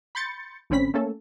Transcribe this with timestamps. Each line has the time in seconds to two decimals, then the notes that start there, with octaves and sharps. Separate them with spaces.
0.15 B5 C6 G6 A6 C#7
0.70 A1 D3 C4 C#4 B5 B6
0.94 A3 A#3 C#4 A4